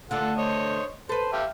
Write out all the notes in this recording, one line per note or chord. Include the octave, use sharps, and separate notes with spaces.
D3 A3 D4 F4 A4 F#5
C5 C#5 D#5
A4 B4 C5
G4 E5 F5